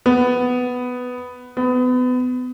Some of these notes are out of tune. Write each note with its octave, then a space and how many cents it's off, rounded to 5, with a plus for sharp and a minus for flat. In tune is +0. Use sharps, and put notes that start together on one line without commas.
B3 +10
B3 +30